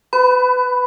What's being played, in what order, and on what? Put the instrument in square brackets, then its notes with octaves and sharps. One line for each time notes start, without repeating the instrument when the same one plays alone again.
[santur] B4 [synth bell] B5